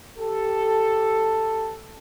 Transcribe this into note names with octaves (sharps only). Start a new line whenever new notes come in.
G4 A4